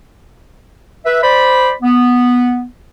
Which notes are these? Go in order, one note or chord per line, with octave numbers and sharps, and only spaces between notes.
B4 E5
C5 D5 B5
B3